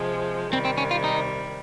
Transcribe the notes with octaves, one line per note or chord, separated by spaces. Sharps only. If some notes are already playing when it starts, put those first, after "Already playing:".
Already playing: C3 F3 G#3
C3 D#3 G3 C4
C4
C#4
F4
D#4